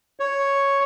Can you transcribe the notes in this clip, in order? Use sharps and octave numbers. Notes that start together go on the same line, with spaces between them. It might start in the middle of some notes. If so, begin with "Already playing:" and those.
C#5